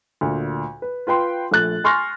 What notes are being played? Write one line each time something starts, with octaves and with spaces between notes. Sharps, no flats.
D2 A#2
B4
F4 B4 G5 C6
A#1 A3 F#6 A6
G#5 C6 C#6 F6 F#6 A#6